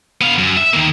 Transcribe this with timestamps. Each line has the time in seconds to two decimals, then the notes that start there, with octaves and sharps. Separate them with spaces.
0.21 B3 F5
0.38 F#2
0.57 E5
0.73 D#3 A#3